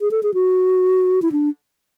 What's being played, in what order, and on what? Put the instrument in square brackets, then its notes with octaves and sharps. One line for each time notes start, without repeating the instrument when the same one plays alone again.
[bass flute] G#4
A4
G#4
F#4
E4
D4